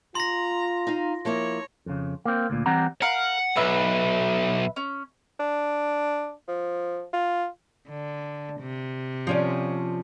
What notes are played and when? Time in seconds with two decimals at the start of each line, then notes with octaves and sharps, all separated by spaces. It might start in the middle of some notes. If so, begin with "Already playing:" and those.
0.15 F4 A#5 C6 A#6
0.87 D#4 F5
1.25 F3 A#3 E4 C#5
1.86 F2 C#3
2.25 A#3 C4
2.50 D2 A#2
2.66 E3 G3 C4 F#5 A#5
3.02 A#4 F5 F#5
3.56 B1 B4 E5
4.76 C#4
5.39 D4
6.48 F3
7.13 F4
7.89 D3
8.61 C3
9.27 F3 C#4 D5